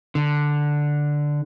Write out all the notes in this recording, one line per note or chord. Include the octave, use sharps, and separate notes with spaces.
D3